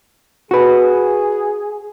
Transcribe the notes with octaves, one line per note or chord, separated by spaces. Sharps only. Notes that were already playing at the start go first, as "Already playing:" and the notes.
F#4 G#4 B4